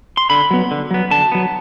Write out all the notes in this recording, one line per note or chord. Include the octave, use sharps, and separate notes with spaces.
C6
D3 B5
F#3 B3
D3
F#3 B3
D3 A5
F#3 B3